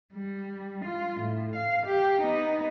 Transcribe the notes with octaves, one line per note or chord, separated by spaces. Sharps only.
G3
F4
A2
F5
G4
B3 D#4